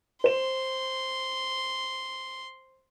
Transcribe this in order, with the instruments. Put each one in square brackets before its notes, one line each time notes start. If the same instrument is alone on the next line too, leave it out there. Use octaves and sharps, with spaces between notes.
[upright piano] C5 E7 [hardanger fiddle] C6